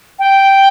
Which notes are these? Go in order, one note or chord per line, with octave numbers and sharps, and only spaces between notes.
G5